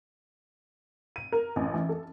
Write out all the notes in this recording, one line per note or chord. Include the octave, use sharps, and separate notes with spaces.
D#7
A#4
A1
E3
A4